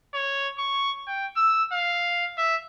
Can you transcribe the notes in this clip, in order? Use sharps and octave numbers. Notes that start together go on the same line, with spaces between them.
C#5
C#6
G5
E6
F5
E5